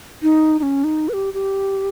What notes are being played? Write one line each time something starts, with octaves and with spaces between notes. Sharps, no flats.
D#4
D#4
C#4
D#4
B4
G4
G4